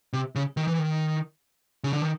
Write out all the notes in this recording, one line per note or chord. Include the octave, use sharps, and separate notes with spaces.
C3
C#3
D#3
E3
D#3
C#3
D3
D#3